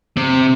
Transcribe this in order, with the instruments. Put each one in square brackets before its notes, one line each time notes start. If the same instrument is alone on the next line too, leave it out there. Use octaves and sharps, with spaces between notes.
[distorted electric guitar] C3